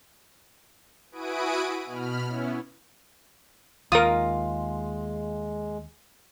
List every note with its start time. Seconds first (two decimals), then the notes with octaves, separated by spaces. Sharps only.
1.12 E4 F#4 B4 G#5 D#6 D7
1.86 B2 B5 F6
2.26 B3 C#4 E4
3.92 D#2 G#3 F4 A#4 D#6